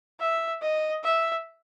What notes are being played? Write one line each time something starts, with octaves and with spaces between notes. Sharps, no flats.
E5
D#5
E5